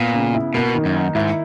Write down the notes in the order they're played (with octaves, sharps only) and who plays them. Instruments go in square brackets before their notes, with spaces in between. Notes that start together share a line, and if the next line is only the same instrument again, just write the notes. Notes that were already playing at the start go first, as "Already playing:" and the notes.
Already playing: [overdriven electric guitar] A#2 [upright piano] B3
[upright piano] C#3
E4
[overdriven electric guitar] B2 [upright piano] A#3
[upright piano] D#3
[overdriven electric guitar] F#2
[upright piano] D#4
[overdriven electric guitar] G#2 [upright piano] E4